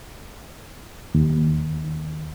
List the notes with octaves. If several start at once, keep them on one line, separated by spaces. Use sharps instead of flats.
D#2